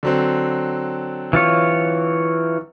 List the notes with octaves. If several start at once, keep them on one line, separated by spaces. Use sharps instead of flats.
D3 F#3 C4
E3 F4 C#5